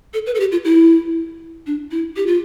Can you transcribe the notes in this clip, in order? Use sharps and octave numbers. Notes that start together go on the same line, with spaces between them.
A4
B4
A4
G4
F4
E4
D4
E4
G4
F4